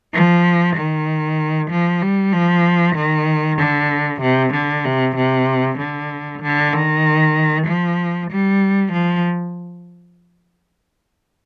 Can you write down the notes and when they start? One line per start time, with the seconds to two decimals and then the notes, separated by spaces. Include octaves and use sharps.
0.13 F3
0.75 D#3
1.71 F3
2.02 G3
2.32 F3
2.95 D#3
3.58 D3
4.21 C3
4.53 D3
4.84 C3
5.15 C3
5.78 D3
6.41 D3
6.73 D#3
7.66 F3
8.30 G3
8.92 F3